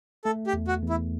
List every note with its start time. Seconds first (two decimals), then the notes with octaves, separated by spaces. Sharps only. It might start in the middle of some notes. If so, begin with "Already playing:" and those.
0.25 A3 A4
0.47 G4
0.53 E2
0.68 F#4
0.82 E2
0.89 E4